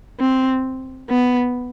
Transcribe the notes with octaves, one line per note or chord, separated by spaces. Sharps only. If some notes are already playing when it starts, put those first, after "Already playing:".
C4
B3